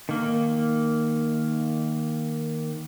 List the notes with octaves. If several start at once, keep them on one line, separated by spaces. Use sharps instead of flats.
D#3 A#3